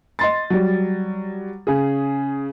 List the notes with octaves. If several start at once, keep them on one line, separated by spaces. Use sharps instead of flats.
D#5 C6 A6
F#3 G3
C#3 G#4